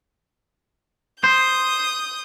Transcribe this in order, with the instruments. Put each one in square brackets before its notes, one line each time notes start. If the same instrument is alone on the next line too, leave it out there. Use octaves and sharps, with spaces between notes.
[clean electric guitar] C5 [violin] D#6 G6